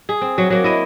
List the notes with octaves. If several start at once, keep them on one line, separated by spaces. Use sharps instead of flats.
G#4
C4
F#3
F#3 A#3
E4 D#5